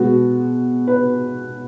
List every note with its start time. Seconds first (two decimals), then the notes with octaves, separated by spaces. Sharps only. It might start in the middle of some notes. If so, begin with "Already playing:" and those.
Already playing: B2 G#3 B3 F#4
0.88 B4